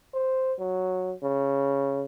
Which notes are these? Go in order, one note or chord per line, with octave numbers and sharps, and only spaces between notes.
C5
F#3
C#3